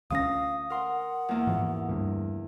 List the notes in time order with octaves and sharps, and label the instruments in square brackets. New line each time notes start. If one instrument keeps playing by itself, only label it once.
[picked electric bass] D2 G#3 C#4 [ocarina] F5 [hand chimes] D#6 A#6
[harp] A#4 C6 [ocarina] F#5
[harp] E2 A#3
[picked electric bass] G#2 E3 F3
D2 G2